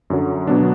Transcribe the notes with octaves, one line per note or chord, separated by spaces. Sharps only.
F#2 D3 F#3
B2 F#3 B3 D4